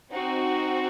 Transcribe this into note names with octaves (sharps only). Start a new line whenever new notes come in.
C4 D#4 F#4